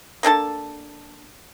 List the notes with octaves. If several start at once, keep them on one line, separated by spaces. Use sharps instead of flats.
A#3 D4 A4 A5